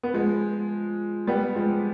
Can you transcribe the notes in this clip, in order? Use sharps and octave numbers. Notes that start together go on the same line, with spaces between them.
B3
F3 G#3
G3 B3
F3 G#3